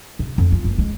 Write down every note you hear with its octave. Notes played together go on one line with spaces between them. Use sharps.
C3
F2
F4
F#1
G#3